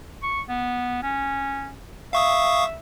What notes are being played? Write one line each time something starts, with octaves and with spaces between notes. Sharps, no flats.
C#6
B3
C#4
E5 F5 C#6 D#6